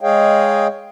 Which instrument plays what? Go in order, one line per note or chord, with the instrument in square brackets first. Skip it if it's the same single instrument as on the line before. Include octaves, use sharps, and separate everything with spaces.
[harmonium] G#3 G#4 C#5 D#5 F5 G5